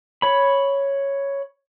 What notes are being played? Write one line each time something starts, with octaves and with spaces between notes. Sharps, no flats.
C#5 B5